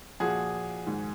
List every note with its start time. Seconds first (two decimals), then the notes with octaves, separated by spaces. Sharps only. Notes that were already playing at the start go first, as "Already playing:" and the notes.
0.20 A#2 F3 F#4 G#4
0.87 G#2 D#3